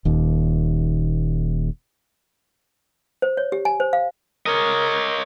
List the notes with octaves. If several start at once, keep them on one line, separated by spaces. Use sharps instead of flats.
D#1 D#2
C5
C#5
G4
G#5
C5
F5
A#4 C#5 D#5